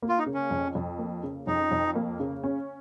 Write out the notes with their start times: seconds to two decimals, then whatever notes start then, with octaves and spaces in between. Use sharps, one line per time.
0.02 A#3
0.09 F4
0.19 D#4
0.26 C#3
0.34 C#4
0.51 F2
0.75 F2
0.99 A#3
1.23 C#3
1.47 F2 D#4
1.71 F2
1.95 A#3
2.20 C#3
2.43 C#4